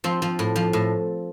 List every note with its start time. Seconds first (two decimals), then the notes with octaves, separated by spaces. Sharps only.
0.04 F3 C4
0.22 F3
0.39 A2
0.56 F3
0.73 A2